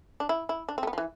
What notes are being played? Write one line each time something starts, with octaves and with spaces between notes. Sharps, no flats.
D4
E4
E4
D4
C4
A3
B3
F3
E3